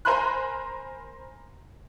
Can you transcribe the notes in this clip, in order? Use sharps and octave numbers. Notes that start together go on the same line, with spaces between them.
A#4 C5 G#5 B5 C6 F#6